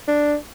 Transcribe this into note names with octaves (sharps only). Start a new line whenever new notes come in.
D4